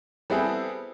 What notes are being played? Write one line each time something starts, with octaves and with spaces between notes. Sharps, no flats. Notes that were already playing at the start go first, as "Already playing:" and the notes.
G3 B3 C4 E4 G#4 A4